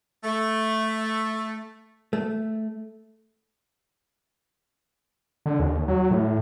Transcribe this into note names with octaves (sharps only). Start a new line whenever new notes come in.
A3
A3
D3
D#2
F#3
A2